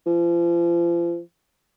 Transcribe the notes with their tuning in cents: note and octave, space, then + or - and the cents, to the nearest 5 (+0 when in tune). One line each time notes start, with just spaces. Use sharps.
F3 -35